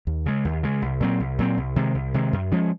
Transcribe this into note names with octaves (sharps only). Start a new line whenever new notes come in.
D#2
C#3 G#3
D#2
C#3 G#3
C2
A#2 F#3 C4
C2
A#2 F#3 C4
C2
C3 D#3 G#3
C2
C3 D#3 G#3
F#2
F3 G#3 C#4